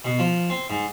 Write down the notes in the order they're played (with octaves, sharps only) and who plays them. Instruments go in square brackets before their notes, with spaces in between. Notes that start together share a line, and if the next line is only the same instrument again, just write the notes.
[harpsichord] B2
F3
C4
G#2